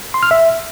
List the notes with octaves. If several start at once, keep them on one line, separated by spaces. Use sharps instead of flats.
C6
F6
E5